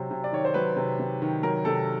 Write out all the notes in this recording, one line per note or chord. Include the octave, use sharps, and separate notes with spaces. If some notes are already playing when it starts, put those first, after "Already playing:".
Already playing: C3 F#3 C5
C3
D5
D#3 C#5
C5
F#3 B4
C3
C3
D#3
F#3 A#4
C3 A4